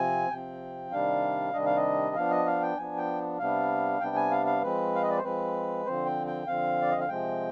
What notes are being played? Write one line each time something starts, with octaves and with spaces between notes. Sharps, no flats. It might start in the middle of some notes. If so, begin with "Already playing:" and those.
Already playing: C3 F3 C4 G#5
C3 F3 C4 G5
C3 D#3 G3 D4 F5
C3 D#3 G3 D4 D#5
F5
D#5
F3 B3 D4 F5
D#5
F5
G5
F3 B3 D4 G#5
G5
C3 G3 B3 D4 F5
C3 G3 B3 D4 G5
G#5
F5
F5
F3 G#3 C4 B4
F5
D#5
D5
C5
F3 G#3 C4 B4
D3 F3 C4 C5
G5
G5
D3 F3 C4 F5
D5
D#5
F5
C3 F3 G#3 C4 G5